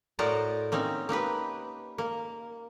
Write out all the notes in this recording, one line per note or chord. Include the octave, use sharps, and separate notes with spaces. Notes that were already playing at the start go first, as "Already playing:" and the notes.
A2 F#4 A#4 C5 D5 D#5
A#3 C4 C#4 D#4
A#3 D#4 G4 B4
A#3